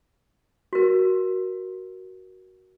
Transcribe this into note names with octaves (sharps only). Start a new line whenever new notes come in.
F#4 A#4